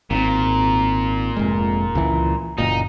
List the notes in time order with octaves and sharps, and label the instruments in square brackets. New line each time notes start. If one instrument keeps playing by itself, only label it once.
[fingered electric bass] G#1 C4 [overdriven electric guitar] A#2
[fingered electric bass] F1 G#3
C#2 E3
[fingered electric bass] F#1 A#2 [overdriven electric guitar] D#4